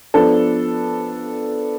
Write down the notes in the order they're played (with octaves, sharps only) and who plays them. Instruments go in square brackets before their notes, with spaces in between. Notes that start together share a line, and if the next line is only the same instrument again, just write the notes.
[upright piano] F3 B3 D4 A4